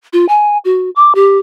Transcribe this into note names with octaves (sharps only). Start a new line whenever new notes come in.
F4
G#5
F#4
D6
G4